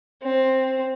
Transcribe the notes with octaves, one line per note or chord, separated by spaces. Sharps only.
C4